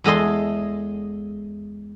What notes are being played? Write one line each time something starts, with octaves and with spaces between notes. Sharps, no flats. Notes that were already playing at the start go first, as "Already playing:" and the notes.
E2 G#3 A4 D#5 C6